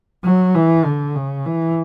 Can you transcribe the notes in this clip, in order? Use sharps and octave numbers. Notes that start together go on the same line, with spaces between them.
F#3
E3
D3
C#3
E3